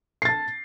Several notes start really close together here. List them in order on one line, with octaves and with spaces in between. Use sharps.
C7 A6 A5